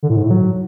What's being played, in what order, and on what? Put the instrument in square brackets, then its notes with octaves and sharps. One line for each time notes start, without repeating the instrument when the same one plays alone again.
[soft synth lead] D3
A2
G#2
A2
F#3